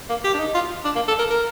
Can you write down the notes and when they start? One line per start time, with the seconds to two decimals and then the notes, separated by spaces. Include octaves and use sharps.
0.10 A#3
0.24 G4
0.34 D4
0.39 D#4
0.55 F4
0.85 D4
0.96 A#3
1.08 A4
1.19 A#4
1.30 A#4